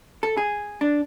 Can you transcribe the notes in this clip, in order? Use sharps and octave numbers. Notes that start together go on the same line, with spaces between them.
A4
G#4
D4